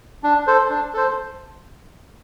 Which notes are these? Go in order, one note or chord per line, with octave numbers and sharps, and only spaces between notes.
D4
A4 C5
D4
A4 C5